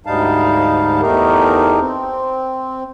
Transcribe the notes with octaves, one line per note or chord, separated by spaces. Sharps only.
D2 G#2 G3 D#4 F5 A5
E2 A3 D#4 G4 A#4
C4